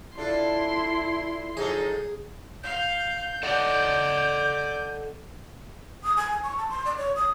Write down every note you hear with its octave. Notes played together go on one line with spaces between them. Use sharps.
D4 E4 F4 A4 C6
F3 D#4 G#4 A4
F5 G6
A4 D5 D#5 F#5
D#6
G#5
G#5
C#6
A5
C6
D5
C#5
D#6